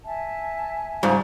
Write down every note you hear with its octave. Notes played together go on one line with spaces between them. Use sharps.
E5 G#5 A5
G#2 C#3 F3 G3